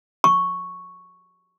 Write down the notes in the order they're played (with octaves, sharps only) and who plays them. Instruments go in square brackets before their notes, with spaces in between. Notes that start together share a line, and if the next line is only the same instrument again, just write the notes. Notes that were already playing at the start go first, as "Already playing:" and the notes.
[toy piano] C#6